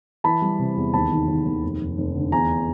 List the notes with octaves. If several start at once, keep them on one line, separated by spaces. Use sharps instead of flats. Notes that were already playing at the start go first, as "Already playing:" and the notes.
E3 A5 B5
G3
C3
E2
D#2 A5 B5
D#3
D#2
D#2
F1
F1
F1
D3
E2 G#5 A#5